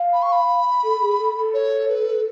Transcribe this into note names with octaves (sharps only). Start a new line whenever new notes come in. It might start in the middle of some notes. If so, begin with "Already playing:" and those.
Already playing: F5
B5
C#6
B5
A4
G#4
A4
A4
C#5
B4